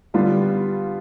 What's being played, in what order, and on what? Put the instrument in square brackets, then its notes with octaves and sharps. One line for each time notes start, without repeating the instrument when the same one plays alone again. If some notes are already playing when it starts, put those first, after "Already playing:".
[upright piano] D3 G3 B3 F4